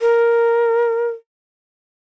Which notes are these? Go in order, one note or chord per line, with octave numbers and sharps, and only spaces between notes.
A#4